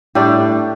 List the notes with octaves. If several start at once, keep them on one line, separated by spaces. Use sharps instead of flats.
A2 G3 D4 G4